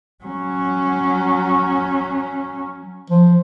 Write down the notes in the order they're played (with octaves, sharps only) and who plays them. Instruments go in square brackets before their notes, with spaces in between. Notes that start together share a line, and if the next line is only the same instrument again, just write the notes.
[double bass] F#3 C#4
[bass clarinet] F3